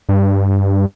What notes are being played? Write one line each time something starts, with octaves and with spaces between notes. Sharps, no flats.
G2